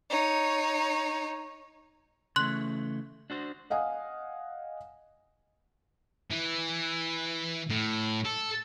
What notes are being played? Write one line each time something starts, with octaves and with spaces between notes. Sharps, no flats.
D#4 C#5
C#3 E3 A3 C6 F#6 F#7
D4 F#4 C5
D#5 F5 F#5 G#5 D#6
E3
A2
A4